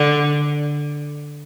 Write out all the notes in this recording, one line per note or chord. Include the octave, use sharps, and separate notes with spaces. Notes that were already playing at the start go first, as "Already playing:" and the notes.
Already playing: D3